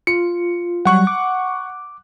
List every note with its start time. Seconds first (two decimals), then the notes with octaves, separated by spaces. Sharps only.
0.07 F4 C#7
0.85 F#3 G3 F#5 C#6 F#6
1.07 D6